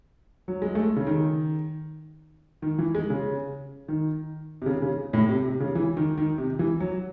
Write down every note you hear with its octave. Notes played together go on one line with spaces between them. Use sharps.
F#3
G#3
A3
C#3
D#3
D#3
E3
G#3
C#3
D#3
C3
C#3
C#3
A2
C3
C3
C#3
E3
D#3
D#3
C3
E3
F#3